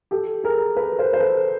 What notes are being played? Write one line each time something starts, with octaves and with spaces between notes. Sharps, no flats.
G4 A4
G#4 A#4
A4 B4
A#4 C5
C5
A4 B4